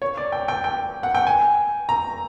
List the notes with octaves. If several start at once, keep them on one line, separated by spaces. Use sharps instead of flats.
C#5
D5
G5
G5
G5
F#5
G5
G#5
A#5